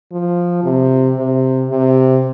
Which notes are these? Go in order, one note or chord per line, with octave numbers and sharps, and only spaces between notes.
F3
C3
C3
C3